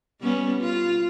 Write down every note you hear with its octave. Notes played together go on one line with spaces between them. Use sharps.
G3 B3 C#4
F4